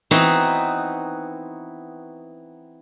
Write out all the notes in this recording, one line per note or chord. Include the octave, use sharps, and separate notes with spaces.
E3 B3 C4 D#4 F#4